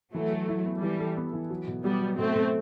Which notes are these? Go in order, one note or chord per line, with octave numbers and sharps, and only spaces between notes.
E3 F#3 A3
A4
E4
B3
E3 G3 E4
A4
B3
E3
F#3
B2
F#3 G3 B3
F#3
B2 A3 C4
B2